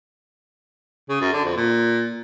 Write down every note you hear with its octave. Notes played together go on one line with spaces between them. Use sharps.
C#3
F#2
D3
F2
A#2